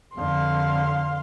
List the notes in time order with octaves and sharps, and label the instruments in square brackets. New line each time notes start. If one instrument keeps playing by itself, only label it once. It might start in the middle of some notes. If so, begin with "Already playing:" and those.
[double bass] F2 D3 [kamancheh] F5 C6